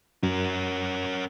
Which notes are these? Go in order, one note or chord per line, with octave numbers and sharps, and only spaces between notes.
F#2 C#4 A#4